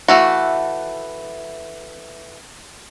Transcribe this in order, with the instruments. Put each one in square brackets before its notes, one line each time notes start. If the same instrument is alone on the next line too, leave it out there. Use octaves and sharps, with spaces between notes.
[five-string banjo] E3 A3 F#4